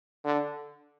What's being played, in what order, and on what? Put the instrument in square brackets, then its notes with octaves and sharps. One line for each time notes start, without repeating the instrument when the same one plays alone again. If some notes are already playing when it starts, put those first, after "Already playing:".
[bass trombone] D3